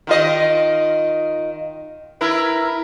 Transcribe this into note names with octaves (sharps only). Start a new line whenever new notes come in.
D#3 F4 D#5
E4 A#4 B4